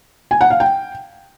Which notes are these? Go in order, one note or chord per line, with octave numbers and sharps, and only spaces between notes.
G#5
F#5
F5
G5